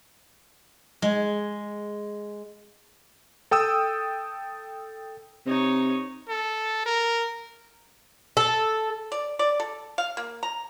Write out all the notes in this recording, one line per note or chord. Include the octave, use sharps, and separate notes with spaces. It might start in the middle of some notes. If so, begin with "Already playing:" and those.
G#3
A4 G5 D#6 E6
C3 D#4 C#5
A4
A#4
A4
D5
D5
A4
F5
A#3
A#5